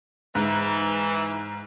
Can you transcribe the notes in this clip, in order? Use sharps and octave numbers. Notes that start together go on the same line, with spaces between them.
G#2 E3